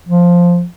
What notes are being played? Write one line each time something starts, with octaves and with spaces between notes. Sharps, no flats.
F3